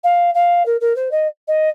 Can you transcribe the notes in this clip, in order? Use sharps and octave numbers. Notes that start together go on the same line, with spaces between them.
F5
F5
A#4
A#4
C5
D#5
D#5